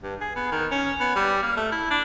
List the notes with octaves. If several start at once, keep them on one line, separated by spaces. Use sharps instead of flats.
G2
G#4
B3
D#3
C#4
B3
G3
A#3
A3
E4
D4